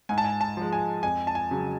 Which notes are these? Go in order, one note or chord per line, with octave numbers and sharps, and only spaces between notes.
G#2 G#5
A5
G#5
A5
F3 G#3
G#5
F2 G#5
A5
G#5
C#3 F#3